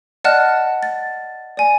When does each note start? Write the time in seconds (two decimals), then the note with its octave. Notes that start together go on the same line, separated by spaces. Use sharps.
0.24 D5 D#5 F#5 A5 F6 F#6
0.83 A6
1.57 D5 G#5